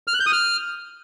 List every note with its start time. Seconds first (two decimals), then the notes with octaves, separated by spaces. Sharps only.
0.08 F6
0.14 F#6
0.20 G6
0.26 D#6
0.33 F6